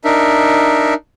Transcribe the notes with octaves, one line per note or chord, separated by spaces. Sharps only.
D4 D#4 A#4 E5